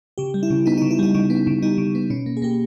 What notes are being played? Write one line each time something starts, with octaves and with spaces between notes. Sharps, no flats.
C#3 G4
G3
E4
C#3
B3 D#4
D#4
C#3
E4
G3 D#4
C#3 D#4
B3
C#3
G3 D#4
C#3
B3
B2 C#4
A#3
G#4
A#3 G4